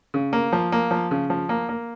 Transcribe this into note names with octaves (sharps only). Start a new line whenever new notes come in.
C#3
A#3
F3
A#3
F3
C#3
F3
A#3
A#3